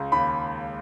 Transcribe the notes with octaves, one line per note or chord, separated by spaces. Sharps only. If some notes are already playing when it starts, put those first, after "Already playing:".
Already playing: C#2
D#2 B5